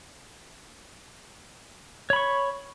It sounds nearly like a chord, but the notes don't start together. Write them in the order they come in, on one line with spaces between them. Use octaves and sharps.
C#5 B5 C#6